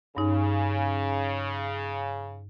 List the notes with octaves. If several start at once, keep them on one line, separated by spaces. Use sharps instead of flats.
G2 C#3 D#4